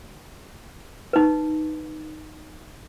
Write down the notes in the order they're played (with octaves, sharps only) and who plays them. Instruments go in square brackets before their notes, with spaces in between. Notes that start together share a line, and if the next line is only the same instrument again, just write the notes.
[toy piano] D#4 B4